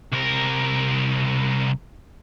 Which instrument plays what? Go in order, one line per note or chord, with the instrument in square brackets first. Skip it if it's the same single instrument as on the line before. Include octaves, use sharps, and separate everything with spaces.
[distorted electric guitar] C2 A#4